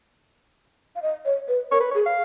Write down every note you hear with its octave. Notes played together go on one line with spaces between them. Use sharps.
F5
D#5
C#5
B4
A#4 C#5
B4
C#5
G#4
F5